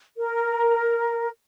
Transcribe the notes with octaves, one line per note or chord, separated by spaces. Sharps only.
A#4